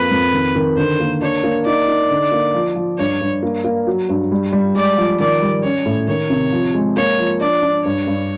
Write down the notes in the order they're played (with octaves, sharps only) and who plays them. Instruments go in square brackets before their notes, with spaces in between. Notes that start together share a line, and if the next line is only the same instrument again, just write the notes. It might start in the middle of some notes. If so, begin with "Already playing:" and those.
Already playing: [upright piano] F2 A#3 [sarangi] B4
[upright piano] F2
D#3
D#3
[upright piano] D3 [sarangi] C5
[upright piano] A#3
[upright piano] D4 [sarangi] C#5
[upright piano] A#3
[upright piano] D#4 [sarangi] D5
[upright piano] D#4
D3
A#3
F3
F3
[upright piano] G2 [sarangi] C#5
[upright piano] G2
A#3
A#3
F#3
G2
G3
G3
[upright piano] G#3 [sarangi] D5
[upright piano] F3
[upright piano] D#3 [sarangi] D5
[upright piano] G3
[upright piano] C#4 [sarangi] C#5
[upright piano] A2
[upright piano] D#3 [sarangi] C#5
[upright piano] C3
F3
G#3
[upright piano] A#3 [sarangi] C#5
[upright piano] F3
[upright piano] D4 [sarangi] D5
[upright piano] D4
[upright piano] G2 [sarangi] C#5
[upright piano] G2